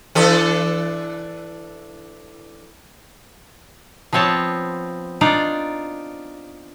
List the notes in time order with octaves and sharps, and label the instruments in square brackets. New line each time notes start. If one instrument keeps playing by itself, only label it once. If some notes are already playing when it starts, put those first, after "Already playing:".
[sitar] E3 D4 A4
[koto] F3 B3 C4 C#5 A5
D4 D#4 F4 D5 F5